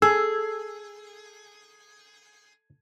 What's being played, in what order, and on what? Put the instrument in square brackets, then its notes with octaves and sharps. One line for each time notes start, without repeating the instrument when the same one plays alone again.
[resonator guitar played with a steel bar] G#4 [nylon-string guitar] A4 [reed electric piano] E6